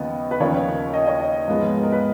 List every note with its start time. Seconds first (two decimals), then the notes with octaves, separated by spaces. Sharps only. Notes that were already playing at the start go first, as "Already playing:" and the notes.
Already playing: D#2 C#3 F3 B3 D#5
0.31 B4
0.40 D#2 C#3 F3 A#3 C#5
0.94 D#5
1.07 C#5
1.20 D#5
1.48 G#2 F3 G#3 B3
1.83 A#4
1.92 B4